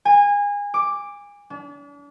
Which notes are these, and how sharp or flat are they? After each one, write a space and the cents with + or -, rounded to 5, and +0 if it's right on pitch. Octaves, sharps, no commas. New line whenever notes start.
G#5 -25
D6 +5
D4 -40